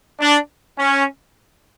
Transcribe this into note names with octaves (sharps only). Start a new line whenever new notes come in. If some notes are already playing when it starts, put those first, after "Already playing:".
D4
C#4